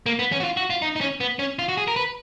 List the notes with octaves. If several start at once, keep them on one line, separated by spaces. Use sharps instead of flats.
A#3
B3
C#4
F#4
F4
F#4
F4
D#4
D#4
C#4
B3
C#4
F4
F#4
G#4
A#4
B4